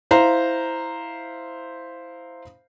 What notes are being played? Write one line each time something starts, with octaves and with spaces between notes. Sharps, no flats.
E4 C5 F5 A#5